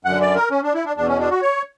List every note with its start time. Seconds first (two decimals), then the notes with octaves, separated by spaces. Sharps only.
0.05 F#2 D3 F#5
0.21 D5
0.36 A#4
0.51 C#4
0.63 D4
0.74 E4
0.85 D4
0.97 E2 B2 D4
1.08 C#4
1.19 D4
1.30 F#4
1.42 C#5